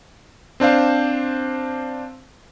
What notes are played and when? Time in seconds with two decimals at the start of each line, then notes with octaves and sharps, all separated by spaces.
0.60 C4 D4 C5 F5